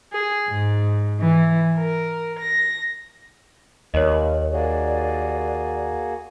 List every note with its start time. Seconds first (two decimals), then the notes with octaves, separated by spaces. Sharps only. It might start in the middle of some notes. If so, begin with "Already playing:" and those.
0.12 G#4
0.49 G#2
1.19 E3
1.78 A#4
2.39 A#6
3.94 D#2 A#4 C#5 D#5
4.52 A#3 F#4 G#4 D5